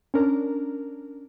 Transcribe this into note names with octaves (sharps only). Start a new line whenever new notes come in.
C#4 D4 A#4